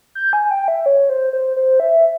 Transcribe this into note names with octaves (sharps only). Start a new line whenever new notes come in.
G6
G#5
G5
E5
C#5
C5
C5
C5
E5